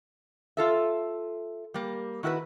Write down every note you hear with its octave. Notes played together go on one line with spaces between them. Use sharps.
F4 A4 E5
G3 A#3
D#3 E4 F#4 A4 B4